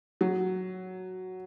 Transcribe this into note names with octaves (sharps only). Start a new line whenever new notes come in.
F#3